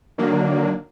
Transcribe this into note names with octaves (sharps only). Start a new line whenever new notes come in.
D3 D#3 F#3 A#3 D4